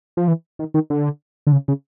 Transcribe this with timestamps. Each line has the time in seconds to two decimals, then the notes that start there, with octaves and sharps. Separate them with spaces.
0.17 F3
0.28 E3
0.59 D#3
0.74 D#3
0.90 D3
1.47 D3
1.52 C#3
1.68 C#3